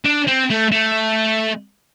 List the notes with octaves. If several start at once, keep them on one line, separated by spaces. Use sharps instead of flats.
D4
C4
A3
A3